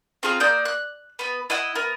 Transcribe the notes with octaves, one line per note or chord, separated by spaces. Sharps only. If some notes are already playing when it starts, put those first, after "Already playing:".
C4 F4 G#4 A#5
A#3 D5 D#6 G6
F#6
B3 B4
E4 D#5 F#5
B3 A#4